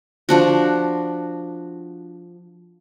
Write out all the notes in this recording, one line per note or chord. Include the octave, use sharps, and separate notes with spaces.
F3 D4 F#4